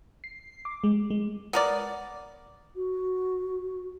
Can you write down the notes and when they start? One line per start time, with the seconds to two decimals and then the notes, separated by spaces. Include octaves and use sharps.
0.24 C7
0.65 D6
0.84 G#3
1.10 G#3
1.53 B3 A#4 D5
2.76 F#4